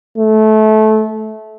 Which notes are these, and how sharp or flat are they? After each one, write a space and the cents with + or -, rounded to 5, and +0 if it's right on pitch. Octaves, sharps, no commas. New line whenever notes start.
A3 -20